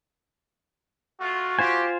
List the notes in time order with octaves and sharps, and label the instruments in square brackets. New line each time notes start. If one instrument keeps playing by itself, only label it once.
[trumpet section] A3 F4 [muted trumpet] F#4
[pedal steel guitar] F4 C5 G#5 [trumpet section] G4